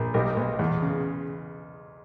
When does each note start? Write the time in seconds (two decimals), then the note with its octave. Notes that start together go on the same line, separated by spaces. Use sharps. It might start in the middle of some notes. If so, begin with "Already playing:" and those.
Already playing: A#1
0.14 B1 G4 A#4
0.37 B1
0.59 E2
0.82 C#3